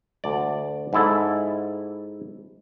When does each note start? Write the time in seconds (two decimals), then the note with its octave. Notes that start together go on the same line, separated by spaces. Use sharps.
0.24 D2 D5
0.93 G#2 E4 A4